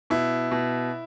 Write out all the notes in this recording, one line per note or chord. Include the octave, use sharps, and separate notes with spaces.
B2 E4
B2